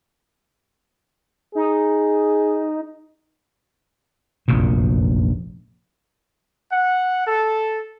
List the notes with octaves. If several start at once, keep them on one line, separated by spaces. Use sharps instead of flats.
D#4 G#4
F1 A#1 F#2 A#2
F#5
A4